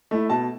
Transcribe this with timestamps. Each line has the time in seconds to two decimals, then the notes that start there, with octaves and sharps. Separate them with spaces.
0.11 A3 E4
0.30 B2 A5